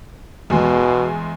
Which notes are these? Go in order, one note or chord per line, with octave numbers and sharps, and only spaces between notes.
E2 B2 G#3